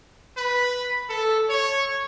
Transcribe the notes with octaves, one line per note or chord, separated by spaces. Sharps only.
B4
A4
C#5